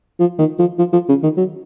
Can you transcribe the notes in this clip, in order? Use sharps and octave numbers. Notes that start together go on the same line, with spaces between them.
F3
D#3
F3
F3
F3
C#3
D#3
F#3